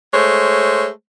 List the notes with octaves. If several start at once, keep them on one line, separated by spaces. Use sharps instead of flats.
G#3 A3 C5 C#5